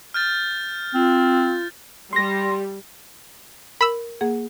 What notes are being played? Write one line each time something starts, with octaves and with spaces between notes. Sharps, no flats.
F6 G6 A6
C4 F4
G3 C6 A#6
A#4 B5 E6
A#3 G#4 F#5